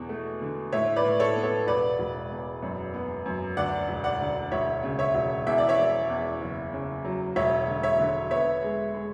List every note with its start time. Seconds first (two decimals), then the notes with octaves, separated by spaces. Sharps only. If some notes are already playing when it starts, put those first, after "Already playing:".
Already playing: E2 B2
0.09 A3
0.41 D3
0.72 A2 C#5 E5
0.96 B4 D5
1.04 A2
1.20 A4 C#5
1.36 B3
1.43 A4 C#5
1.67 E1 B4 D5
1.99 E1
2.31 E2
2.62 F#2
2.94 B3
3.26 F#2
3.57 D2 D5 F#5
3.89 E1
4.04 D5 F#5
4.21 D2
4.52 E1 C#5 E5
4.83 C#3
4.99 C#5 E5
5.15 E1
5.46 E2 E5
5.58 D5
5.69 C#5 E5
5.78 E2
6.10 E2
6.41 F#1
6.73 C#3
7.05 F#3
7.36 E1 C#5 E5
7.68 D3
7.83 C#5 E5
7.99 D3
8.31 B3 C#5 E5
8.62 G#3
8.94 G#3